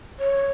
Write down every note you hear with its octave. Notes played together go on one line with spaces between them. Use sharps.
C#5